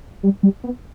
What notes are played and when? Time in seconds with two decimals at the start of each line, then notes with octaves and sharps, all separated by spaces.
0.23 G3
0.43 G3
0.64 B3